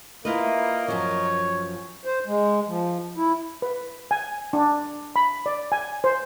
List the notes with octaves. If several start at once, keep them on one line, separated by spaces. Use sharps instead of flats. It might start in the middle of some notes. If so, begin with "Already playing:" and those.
A#3 E4 F4 A#4 B4 D#5
F#2 F3 C#5
C5
G#3
F3
E4
B4
G#5
D4
B5
D5
G#5
C5